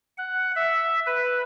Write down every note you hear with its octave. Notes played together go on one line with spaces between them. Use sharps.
F#5
E5
B4